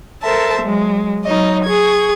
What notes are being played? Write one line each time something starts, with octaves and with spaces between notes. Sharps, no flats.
A4 A#4 C5 E5 A5
F#3 G#3
F#3 D#4 C#5 D#5
G#4 C#6 G#6